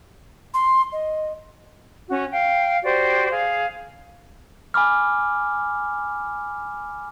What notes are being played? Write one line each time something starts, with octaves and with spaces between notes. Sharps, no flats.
C6
D#5
C#4 F#4
F5 G5
F#4 G4 C5 D5
G#4 F5
G#5 B5 D6 F6